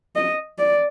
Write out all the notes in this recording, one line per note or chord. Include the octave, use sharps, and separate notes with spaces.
D#5
D5